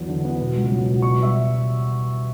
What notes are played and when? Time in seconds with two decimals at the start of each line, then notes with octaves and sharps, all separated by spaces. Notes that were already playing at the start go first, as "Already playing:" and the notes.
Already playing: E2 F#3
0.08 D3
0.25 B3
0.40 B2
0.55 C#2
0.71 F#3
0.87 B2
1.02 B2 C#6
1.18 G3 E5